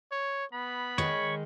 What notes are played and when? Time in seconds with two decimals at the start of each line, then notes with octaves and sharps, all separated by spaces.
0.12 C#5
0.53 B3 B5
0.98 D#3 G#3 C#5